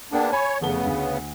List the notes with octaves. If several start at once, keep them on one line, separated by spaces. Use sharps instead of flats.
A#3 B3 D4 G#4 G5
C#5 G#5 B5
F1 C#3 A3 B3 G7
D2